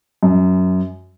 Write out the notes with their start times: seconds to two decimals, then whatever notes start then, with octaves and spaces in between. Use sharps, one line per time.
0.23 F#2